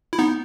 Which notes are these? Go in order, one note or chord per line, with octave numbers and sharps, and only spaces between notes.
E4
B3 D#4